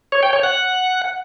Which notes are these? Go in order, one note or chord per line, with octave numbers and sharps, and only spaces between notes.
C#5
G5
C#5
F#5